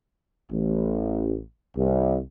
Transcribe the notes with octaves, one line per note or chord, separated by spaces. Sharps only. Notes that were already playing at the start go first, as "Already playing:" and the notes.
A1
C2